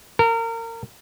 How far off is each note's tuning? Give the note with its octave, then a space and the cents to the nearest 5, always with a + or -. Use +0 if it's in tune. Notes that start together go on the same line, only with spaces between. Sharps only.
A#4 -30